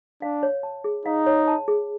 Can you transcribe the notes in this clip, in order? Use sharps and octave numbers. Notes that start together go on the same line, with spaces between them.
D4 F5
C#5
A5
G#4
D#4 F5
C#5
A5
G#4